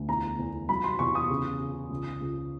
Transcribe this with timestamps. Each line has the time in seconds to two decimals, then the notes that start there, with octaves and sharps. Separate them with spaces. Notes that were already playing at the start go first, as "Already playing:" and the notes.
Already playing: D2
0.08 E2 A#5
0.39 E2
0.69 F#3 B5
0.84 C6
0.99 E2 C#6
1.15 D#6
1.30 C#3
1.60 C#3
1.90 C#2
2.21 C#2